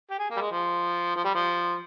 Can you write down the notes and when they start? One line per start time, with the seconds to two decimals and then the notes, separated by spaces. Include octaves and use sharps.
0.10 G4
0.19 G#4
0.30 A#3
0.36 G3
0.40 G#3
0.52 F3
1.16 F3
1.24 G3
1.34 F3